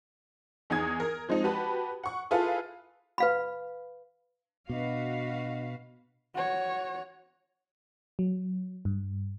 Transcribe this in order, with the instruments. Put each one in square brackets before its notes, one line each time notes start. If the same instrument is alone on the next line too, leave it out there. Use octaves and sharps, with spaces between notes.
[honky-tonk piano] E2 D#4 G#4 D#6 G#6
A#4
F3 G#3 C4 D#4
F#4 G4 B4 A5 B5
F#5 C#6
E4 F4 G#4 A4 B4 F5
[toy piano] B4 F5 B5
[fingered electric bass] B2 [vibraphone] D4 D#5 [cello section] F#4 B4 F5
[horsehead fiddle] F#4 C#5
[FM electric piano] F#3
G2